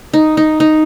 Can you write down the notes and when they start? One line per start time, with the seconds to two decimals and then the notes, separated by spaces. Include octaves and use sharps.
0.13 D#4
0.37 D#4
0.60 D#4